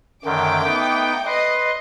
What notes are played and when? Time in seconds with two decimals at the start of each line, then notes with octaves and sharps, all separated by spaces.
0.25 F#2 D3 D#3 A3 G5 D6
0.65 B3 D#4
1.26 B4 D#5 C6